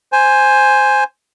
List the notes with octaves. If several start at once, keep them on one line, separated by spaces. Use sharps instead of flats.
C5 G#5